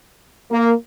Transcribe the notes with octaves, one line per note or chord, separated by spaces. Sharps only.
A#3